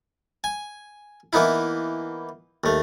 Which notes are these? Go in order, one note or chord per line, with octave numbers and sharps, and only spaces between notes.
G#5
E3 A#3 B3 D#4 E4
D#2 A3